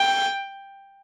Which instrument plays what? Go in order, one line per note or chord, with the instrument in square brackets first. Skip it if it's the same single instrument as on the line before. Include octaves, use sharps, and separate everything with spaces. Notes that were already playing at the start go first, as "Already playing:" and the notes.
Already playing: [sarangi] G5